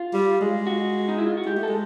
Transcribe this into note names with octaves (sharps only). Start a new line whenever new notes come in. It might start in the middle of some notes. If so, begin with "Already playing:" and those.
Already playing: F4
G3
G#3
F#4
D#4
E4
F4
F#4
G#3 G4
A3
A4
G#3